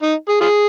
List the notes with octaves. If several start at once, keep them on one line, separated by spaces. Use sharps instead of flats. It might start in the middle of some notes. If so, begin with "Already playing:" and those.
D#4
G#4
F4 G#4